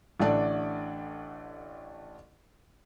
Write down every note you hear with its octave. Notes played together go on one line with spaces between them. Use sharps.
A1 D3 A3 D4 D5